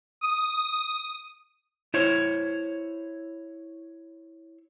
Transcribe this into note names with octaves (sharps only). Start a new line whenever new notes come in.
D#6
E4 C5 C#5